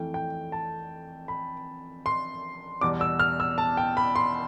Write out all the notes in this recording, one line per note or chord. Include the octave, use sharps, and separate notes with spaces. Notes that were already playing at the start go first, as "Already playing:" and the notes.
Already playing: F2 E3 A3 G5
G5
A5
B5
C6
E2 B2 G3 D6
E6
F6
E6
A5
G5
B5
C6